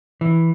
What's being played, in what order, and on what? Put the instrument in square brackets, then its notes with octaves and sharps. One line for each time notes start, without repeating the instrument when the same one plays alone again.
[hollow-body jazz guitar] E3